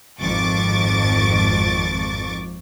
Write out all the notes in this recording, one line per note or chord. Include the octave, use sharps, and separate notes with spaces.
G#1 F2 C#6 D6 A6